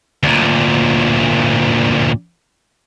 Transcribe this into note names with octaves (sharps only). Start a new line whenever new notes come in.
D2 A#2